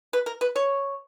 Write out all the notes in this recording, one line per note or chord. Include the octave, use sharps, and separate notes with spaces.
B4
A#4
B4
C#5